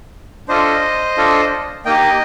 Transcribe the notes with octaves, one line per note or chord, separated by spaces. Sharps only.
D4 F4 A4 C5 D#5
D4 F4 A4
A#3 D#4 G4 D#5 G5